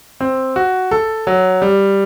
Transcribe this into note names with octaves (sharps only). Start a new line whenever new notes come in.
C4
F#4
A4
F#3
G3